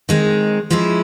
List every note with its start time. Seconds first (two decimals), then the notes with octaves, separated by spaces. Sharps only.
0.09 D#3 G#3 C4
0.70 F3 G#3 C#4 E4